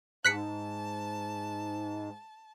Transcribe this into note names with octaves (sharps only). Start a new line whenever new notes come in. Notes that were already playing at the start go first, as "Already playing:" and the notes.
G#2 A5 F#6 B6 C#7